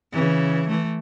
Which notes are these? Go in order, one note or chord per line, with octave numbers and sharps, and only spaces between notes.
C#3 E3
E3 A3